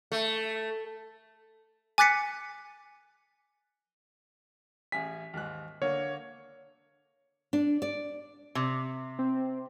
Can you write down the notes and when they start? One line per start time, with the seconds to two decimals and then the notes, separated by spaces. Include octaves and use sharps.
0.12 A3
1.98 G#5 D6 F#6 A6 B6 C#7
4.92 A1 G#4 G#5 B6
5.34 D#2 G#2 F#6
5.82 D3 A#3 C#5
7.53 D4
7.82 D5
8.55 C3
9.19 C4